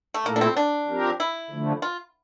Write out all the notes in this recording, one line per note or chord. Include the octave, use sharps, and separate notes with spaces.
A3
A#2 A3 A#3 E4 A4
D4
C4
D4
F3 C4 G4 A#4
E4
D3 F3 A3
F4